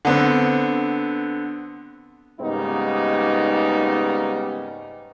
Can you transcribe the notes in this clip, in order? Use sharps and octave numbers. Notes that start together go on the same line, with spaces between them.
D3 B3 C4
G#2 C#3 G3 A#3 B3 D#4